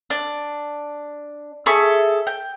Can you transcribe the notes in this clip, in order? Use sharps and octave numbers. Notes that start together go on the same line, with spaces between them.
D4
G#4 A4 E5 C#6
G5